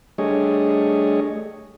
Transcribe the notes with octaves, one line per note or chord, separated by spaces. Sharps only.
G3 A3 D4 G#4 C#5 D#5